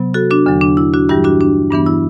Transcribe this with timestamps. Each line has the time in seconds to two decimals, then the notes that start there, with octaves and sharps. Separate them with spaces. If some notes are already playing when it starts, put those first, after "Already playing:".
Already playing: C3 F#3 B3
0.14 F#4 A4
0.31 D4 F#4
0.46 E2 D3 F#3
0.61 D4
0.77 E4
0.94 D4 F#4
1.09 G2 E3 G3 E4 G4
1.24 D4 F#4
1.41 D4
1.71 G2 E3 B3 D4
1.86 E4